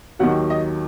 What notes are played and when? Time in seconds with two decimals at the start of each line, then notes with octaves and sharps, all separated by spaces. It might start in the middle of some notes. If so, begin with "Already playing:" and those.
0.19 D#2 D#3 F#3 F#5
0.50 D#5